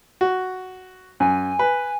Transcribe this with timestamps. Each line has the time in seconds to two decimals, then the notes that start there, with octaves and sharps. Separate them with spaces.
0.21 F#4
1.20 F#2 G#5
1.59 B4